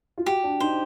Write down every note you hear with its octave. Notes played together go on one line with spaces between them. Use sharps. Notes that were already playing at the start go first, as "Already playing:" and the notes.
F4
F#4 G4
D4
D#4 C5